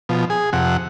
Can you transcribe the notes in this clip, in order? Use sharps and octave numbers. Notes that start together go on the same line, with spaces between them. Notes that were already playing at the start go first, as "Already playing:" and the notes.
B2 F3
G#4
F2 C3 F#5